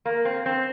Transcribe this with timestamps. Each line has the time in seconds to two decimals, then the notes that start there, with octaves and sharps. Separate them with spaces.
0.05 A#3
0.25 C4
0.46 C4